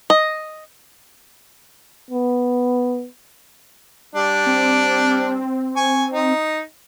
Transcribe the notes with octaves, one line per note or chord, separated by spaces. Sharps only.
D#5
B3
G3 D4
C4
G#5 C#6
D#4